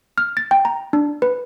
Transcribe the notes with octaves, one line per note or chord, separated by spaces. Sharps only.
F6
A6
G5
A#5
D4
B4